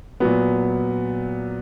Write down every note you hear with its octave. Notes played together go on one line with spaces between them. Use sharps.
A#2 F#3 B3